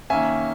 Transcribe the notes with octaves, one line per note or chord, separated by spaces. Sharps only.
D#3 A#3 C#4 E5 G#5